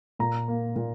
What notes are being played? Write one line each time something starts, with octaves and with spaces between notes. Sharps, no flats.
A#2 A#5
A#3
A#2